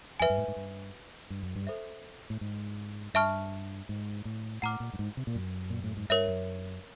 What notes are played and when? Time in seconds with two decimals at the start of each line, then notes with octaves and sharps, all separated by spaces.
0.20 F2 B4 E5 G#5
0.30 G2
0.38 G#2
0.48 G#2
0.56 G2
1.30 G2
1.43 F#2
1.55 G2
1.67 A4 C5 E5
2.30 A2
2.41 G#2
3.14 G2 E5 A5 C#6 F6
3.89 G#2
4.25 A2
4.62 A2 F#5 A#5 D6 F6
4.80 A#2
4.93 G2
4.99 G#2
5.17 C3
5.27 A#2
5.35 F#2
5.70 A#2
5.84 A2
5.97 G#2
6.10 G2 A#4 C#5 E5
6.28 F#2